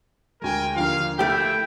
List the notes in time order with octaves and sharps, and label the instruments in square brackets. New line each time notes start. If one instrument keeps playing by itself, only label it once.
[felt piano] D2 G#3 [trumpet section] A#4 G5 G#5
[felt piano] D#2 D3 F3 [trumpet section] F5
[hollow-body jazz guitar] A3 G4 [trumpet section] E4 [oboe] G5